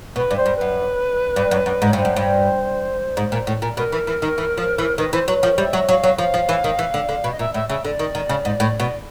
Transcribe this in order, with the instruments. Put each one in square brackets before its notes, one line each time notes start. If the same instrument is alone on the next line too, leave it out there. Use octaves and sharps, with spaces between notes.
[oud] B2 [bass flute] B4
[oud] G2
[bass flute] C5
[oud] G2
[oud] F#2 [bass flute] B4
[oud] G2
F#2
F#2
G#2
[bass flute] C#5
[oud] G2 [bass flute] C5
[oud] F#2
G2
G#2
A#2
A2
A#2
[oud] B2 [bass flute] A#4
[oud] E3
E3
D#3
E3
F3
E3
[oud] D#3 [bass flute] B4
[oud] E3 [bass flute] C5
[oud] F#3 [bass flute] B4
[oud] F3 [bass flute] A#4
[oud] G3 [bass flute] E5
[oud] F#3
[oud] F#3 [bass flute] F5
[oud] F#3
[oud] F3 [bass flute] F5
[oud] F3
E3
D#3
E3
D3
D3
B2
[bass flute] D#5
[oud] A#2 [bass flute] E5
[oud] A2 [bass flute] E5
[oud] C#3 [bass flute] E5
[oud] D3 [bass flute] D5
[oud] D#3
D#3
C#3
G#2
A2
B2